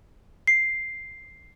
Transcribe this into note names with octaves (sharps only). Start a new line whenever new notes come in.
C7